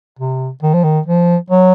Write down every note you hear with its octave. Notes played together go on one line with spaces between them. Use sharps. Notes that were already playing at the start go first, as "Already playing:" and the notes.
C3
D#3
F3
D#3
F3
F#3